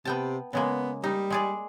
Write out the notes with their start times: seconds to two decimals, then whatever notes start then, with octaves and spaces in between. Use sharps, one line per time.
0.05 C3 B3 G5 A5
0.53 C#3 G#3 A#3 B3
1.04 G3 D#4
1.30 G#3 G#4 D5